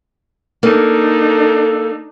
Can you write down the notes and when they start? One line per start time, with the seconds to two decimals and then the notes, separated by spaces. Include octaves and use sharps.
0.63 A#3 D4 D#4 A4